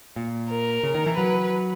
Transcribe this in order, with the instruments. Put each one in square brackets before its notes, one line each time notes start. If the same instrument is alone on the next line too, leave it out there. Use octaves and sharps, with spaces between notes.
[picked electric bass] A#2
[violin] A#4
[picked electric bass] C#3
D#3
E3
[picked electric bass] F#3 [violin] B4